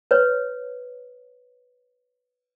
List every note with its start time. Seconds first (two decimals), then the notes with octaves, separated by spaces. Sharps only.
0.11 B4 C#5